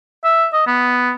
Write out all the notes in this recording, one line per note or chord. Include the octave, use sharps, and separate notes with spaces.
E5
D#5
B3